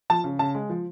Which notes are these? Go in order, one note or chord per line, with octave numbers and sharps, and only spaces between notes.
F3 A5
C#3
C#3 A5
G#3
F3